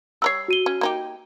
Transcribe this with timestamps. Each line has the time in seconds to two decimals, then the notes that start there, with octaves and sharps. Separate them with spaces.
0.22 G3 A#4 C#5 E6 C7
0.48 F#4 D#7 G7
0.66 C#4
0.81 A#3 D#4 G4